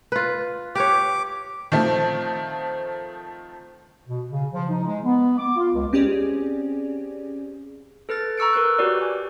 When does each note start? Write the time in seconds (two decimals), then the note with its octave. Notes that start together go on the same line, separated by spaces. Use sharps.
0.12 F4 B4
0.75 G4 B4 C#5 D6
1.72 D#3 F3 A3 C4
4.07 B2
4.29 C#3
4.53 F3
4.70 D#4
4.85 G#3
5.03 B3
5.38 D6
5.57 F4
5.74 C#2
5.93 C4 C#4 G4 G#4 D5
8.09 A4 B4 F6 A6
8.38 A#5 C#6 E6 C#7 D7
8.53 A#4 B4 E6 F#6
8.79 F#4 G4 A#4 B4 C#5 D5
9.02 G#5